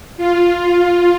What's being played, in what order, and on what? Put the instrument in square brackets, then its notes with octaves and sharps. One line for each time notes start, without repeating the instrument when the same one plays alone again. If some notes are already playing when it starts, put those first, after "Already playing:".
[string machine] F4